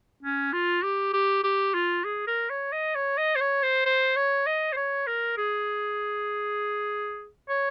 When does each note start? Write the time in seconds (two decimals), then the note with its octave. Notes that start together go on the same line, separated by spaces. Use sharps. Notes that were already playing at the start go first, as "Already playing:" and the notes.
0.23 C#4
0.53 F4
0.83 G4
1.13 G4
1.44 G4
1.74 F4
2.05 G#4
2.27 A#4
2.50 C#5
2.73 D#5
2.95 C#5
3.18 D#5
3.36 C5
3.41 C#5
3.63 C5
3.86 C5
4.16 C#5
4.47 D#5
4.73 C5
4.77 C#5
5.07 A#4
5.37 G#4
7.49 C#5